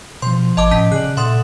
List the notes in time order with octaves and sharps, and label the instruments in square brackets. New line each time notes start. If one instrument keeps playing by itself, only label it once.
[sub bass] B2 [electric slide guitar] F3 C5 [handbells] C6
[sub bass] G#1 [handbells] D#5 A5 D6
[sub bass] A2 [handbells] C#4 A5 B6
[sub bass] C#3 [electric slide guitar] G#4 D5 [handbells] F#6
[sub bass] A#2 [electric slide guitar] A4 D5 F#5 [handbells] E5 C6 D#6